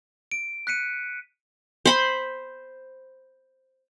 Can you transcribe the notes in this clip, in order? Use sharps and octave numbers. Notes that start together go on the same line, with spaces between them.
D7
F#6 B6 C#7 D#7
C5 B5 C6